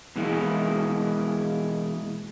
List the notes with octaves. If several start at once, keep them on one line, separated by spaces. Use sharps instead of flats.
B2 E3 G#3 A#3 E4